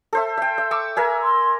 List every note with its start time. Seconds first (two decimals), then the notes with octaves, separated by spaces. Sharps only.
0.13 A4 C5 E5
0.37 E5 G5
0.58 E5
0.71 C#6 D6 E6
0.97 A#4 E5 G#5
1.22 C6